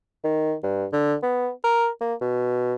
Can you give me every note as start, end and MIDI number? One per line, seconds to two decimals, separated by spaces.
0.24 0.54 51
0.63 0.85 43
0.93 1.15 50
1.23 1.49 59
1.64 1.89 70
2.01 2.14 58
2.21 2.74 47